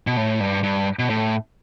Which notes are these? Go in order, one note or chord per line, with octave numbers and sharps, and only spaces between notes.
B2
A2
G2
G2
B2
A2